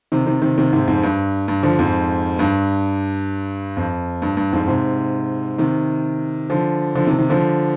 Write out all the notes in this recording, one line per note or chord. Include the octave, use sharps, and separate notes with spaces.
C3 D#3
C3 D#3
C3 D#3
C3 D#3
G#2 C3
F2 G#2
G2
G2
D3 F3
F2 G#2
G2
F2
G2
G2
F2 G#2
G#2 C3
C3 D#3
D3 F3
D3 F3
C3 D#3
C3 D#3
D3 F3